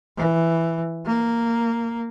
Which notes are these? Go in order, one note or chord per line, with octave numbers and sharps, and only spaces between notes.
E3
A#3